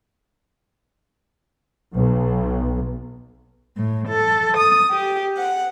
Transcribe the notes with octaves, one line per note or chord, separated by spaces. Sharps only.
B1
A2
A4
D#6
G4
F#5